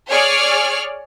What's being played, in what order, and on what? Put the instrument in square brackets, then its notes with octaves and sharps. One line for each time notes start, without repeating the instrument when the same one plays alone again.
[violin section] G#4 C#5 D5 F6